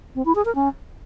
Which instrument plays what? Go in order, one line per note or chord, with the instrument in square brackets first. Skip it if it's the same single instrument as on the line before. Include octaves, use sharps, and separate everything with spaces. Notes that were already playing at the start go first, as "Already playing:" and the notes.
[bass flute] C4
E4
G#4
A#4
C#4